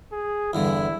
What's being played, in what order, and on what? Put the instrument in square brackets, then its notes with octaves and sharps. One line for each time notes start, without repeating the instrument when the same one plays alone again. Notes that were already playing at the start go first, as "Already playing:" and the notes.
[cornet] G#4
[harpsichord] E2 G2 D3 [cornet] E4